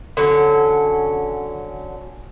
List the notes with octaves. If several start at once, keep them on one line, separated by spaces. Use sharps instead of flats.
D3 F#3 C#4